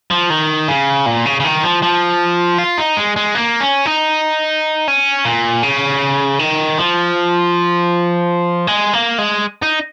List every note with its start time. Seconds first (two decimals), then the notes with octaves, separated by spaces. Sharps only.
0.11 F3
0.30 D#3
0.68 C#3
1.06 A#2
1.26 C#3
1.40 C#3
1.45 D#3
1.64 F3
1.83 F3
2.58 F4
2.78 D#4
2.97 G#3
3.16 G#3
3.35 A#3
3.60 C#4
3.86 D#4
4.88 C#4
5.25 A#2
5.63 C#3
6.39 D#3
6.78 F3
8.67 G#3
8.93 A#3
9.18 G#3
9.63 D#4